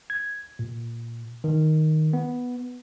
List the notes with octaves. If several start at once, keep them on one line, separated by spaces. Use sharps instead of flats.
G#6
A#2
D#3
B3